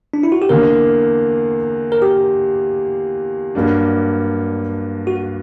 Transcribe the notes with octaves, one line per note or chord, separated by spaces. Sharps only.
D4
E4
F#4
G4
E2 D3 A#3 A#4
A#4
G4
G2 F#3 A#3 D4
F#4